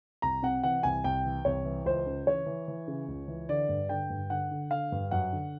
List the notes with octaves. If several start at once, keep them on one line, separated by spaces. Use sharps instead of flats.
C2 A#5
C3 F#5
E3 F#5
C2 G#5
C2 G5
E3
C2 C#5
E3
C#2 C5
C#3
E3 C#5
E3
E3
C#3
C#2
E3
D3 D5
G2
D3 G5
G2
D3 F#5
D3
D3 F5
G2
F#2 F#5
D3